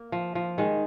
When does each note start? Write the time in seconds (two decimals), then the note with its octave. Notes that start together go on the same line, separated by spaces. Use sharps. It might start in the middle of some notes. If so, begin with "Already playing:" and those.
Already playing: A#3
0.12 F3
0.35 F3
0.58 D#3 G#3